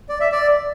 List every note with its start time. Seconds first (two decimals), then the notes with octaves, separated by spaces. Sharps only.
0.09 D5
0.21 E5
0.32 D5